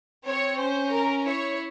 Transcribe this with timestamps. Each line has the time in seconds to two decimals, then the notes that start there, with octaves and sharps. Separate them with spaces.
0.24 C4 C#5
0.57 C#4 C5
0.91 A#4
1.25 E4 C#5